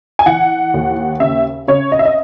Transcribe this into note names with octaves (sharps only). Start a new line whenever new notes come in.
G#5
E3 F#5
D#2
C#3 E5
C#3 C#5
D#5
E5
D#5